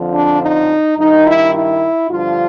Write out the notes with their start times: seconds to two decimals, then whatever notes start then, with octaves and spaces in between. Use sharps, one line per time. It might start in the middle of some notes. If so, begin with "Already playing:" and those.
Already playing: F2 D3 F3
0.14 D4
0.42 D#4
0.98 G2 D#3 D#4
1.26 E4
1.55 E4
2.11 G2 D3 F3 F4